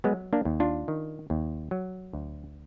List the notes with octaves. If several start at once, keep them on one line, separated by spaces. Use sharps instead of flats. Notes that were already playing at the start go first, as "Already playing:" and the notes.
F#3 G#3 B3
A#3 D4
D#2
D4 F4
D#3
D#2
F#3
D2